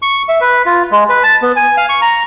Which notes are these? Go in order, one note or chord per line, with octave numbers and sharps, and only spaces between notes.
C#6
E5
B4
F4
G#3
B4
A5
B3
G#5
F5
C#6
A#5